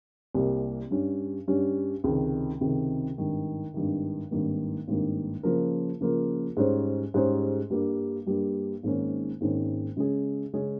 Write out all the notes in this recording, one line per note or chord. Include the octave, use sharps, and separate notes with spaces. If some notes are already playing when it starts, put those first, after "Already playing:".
C2 C3 G3 A#3
G2 G3 C#4
G2 G3 C#4
C#2 C3 D#3
C#2 C3 D#3
G#1 G2 D#3
G#1 G2 D#3
G#1 G2 D#3 A#3
G#1 G2 D#3 A#3
C#3 F3 A#3 F4 A#4
C#3 F3 A#3 F4 A#4
G#2 G3 C#4 G#4 C5
G#2 G3 C#4 G#4 C5
G2 G3 A#3
G2 G3 A#3
G#1 G#2 D#3 A#3 C#4
G#1 G#2 D#3 A#3 C#4
C#3 G#3 C#4 G#4
C#3 G#3 C#4 G#4